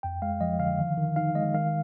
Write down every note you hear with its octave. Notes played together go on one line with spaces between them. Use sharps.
F2 G5
G#3 F5
F3 D#5
D3 F5
D#3
D#3
D#4 F5
G#3 D#5
D#3 F5